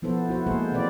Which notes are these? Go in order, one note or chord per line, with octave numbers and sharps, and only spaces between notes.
F3 B3 E4 A4 C5
E4 F#4 C5
G#3 A#3 G#4 A4 C5
E3 C4 E4 B4 D5